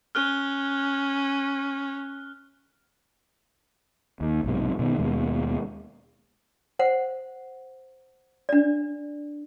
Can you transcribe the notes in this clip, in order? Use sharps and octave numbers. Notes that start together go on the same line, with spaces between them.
C#4 F6 F#6 G7
D#2
B1 G#2 C3
B2 D#3 A3 B3
D#2 B2 G#3
C5 F#5
D4 D5